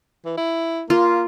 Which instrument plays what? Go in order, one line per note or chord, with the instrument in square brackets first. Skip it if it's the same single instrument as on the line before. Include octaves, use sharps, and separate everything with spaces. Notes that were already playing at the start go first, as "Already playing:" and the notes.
[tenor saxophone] E3
E4
[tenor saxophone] A#3 [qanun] F4